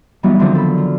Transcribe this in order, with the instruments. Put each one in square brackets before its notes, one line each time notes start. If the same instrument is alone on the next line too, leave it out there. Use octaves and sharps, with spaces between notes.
[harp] E3 F#3 G3 B3 D#4
D3 D#3 F3 F#3 C4 D4
A4 B5
F4